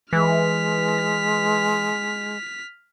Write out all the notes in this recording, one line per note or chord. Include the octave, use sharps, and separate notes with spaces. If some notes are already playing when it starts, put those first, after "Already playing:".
E3 G#3 F6 B6